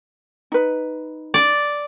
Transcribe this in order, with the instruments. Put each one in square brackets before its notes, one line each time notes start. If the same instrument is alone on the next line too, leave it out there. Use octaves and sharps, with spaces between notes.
[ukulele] D#4 B4
[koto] D5